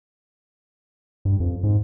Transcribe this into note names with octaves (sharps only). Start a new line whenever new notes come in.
G2
F2
G#2